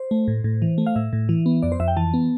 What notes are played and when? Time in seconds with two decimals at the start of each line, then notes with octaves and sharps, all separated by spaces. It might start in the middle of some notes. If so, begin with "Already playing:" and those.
Already playing: C5
0.11 A3
0.28 A2
0.44 A2
0.62 E3
0.78 A3
0.87 F5
0.96 A2 E5
1.13 A2
1.29 E3
1.46 B3
1.63 F2 D5
1.72 C5
1.80 F2 E5
1.88 G5
1.97 E3 A5
2.14 B3